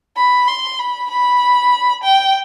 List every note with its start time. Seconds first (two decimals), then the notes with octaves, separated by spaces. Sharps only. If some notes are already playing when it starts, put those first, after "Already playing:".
0.17 B5
0.48 C6
0.79 B5
1.10 B5
2.04 G5